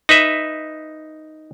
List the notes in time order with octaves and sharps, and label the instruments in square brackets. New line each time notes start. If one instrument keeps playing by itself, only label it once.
[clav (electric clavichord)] D#4 B4 E5